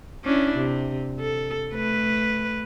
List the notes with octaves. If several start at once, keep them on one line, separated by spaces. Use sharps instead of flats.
C#4 D4 E4
C3
A4
A3 B4